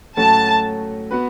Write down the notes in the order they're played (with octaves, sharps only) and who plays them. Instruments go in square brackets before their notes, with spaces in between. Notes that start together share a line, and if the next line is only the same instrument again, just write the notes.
[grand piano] A2 F#3 A3 C#4 F#4 [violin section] A5
[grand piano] B3 F#4 B4